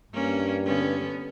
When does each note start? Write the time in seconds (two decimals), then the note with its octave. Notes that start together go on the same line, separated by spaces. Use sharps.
0.13 G2 A#3 C#4
0.65 D3 B3 C#4